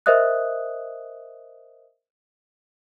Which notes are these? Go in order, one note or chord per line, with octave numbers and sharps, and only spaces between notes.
A#4 C5 D#5 E5 D#6 F#6